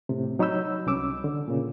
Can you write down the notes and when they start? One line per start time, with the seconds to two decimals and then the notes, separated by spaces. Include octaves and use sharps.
0.09 A2 C3
0.39 F#3 D#4 C#5 B5 E6 G6
0.87 C2 C#4 D6 E6
1.24 D3
1.48 A#2 C#3